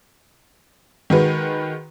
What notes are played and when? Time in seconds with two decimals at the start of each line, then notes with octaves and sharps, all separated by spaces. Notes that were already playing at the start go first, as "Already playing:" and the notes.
1.10 D#3 G#3 F#4 B4